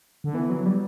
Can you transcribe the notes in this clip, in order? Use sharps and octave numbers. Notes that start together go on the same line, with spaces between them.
D3
E3 B3
F#3
G3